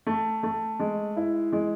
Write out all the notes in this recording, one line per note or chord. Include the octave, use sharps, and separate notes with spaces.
A3
A3
G#3
E4
G#3